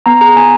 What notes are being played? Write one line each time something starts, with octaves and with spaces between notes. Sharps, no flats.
B3 A#5
G#4 A#5
B3 G#5